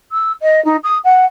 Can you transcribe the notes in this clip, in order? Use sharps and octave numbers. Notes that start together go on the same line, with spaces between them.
E6
D#5
D#4
D#6
F#5